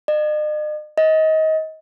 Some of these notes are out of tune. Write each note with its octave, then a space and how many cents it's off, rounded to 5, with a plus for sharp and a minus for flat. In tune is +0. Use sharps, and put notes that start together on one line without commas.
D#5 -45
D#5 +25